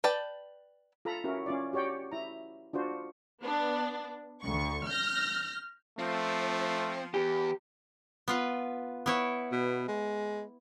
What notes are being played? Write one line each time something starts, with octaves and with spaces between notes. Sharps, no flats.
B4 D5 G5 A5
F4 A4 A#5 B5
C#4 E4 F#4 A#4
C#4 F4 D5
F#4 G4 C#5 D5 G5
E4 A#5
D4 F4 F#4 C5
B3 D4
D2 C#6
F6 G6 A#6
F3 A3 C4
E2 G4
B3 F4 B4
B3 E4 C#5
B2
G#3